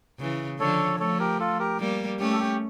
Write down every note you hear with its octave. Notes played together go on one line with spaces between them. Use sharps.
C#3 E3
D3 F3 A4 C#5
F3 A3 A4 C#5
G4 A#4
F4 A4
G4 A#4
G3 A#3
A3 C#4 G4
A4
G4